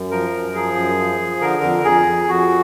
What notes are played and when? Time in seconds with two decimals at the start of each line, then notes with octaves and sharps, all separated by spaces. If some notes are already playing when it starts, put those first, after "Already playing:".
Already playing: F#2
0.11 F3 A#4
0.32 F#2
0.54 F3 G#4
0.76 F#2
0.98 F3
1.19 F3
1.41 D3 A#4
1.63 F2
1.84 F2 G#4
2.07 F2
2.29 F2 F#4